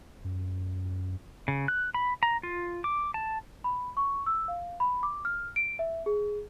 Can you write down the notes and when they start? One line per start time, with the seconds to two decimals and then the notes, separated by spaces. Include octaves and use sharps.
0.24 F#2
1.48 C#3
1.68 F#6
1.94 B5
2.23 A#5
2.43 F4
2.84 D6
3.14 A5
3.64 B5
3.97 C#6
4.26 E6
4.48 F5
4.80 B5
5.03 D6
5.25 F6
5.56 D7
5.79 E5
6.06 G#4